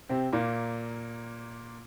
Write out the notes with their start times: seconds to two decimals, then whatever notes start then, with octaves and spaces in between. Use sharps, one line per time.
0.09 C3 C4
0.33 A#2 A#3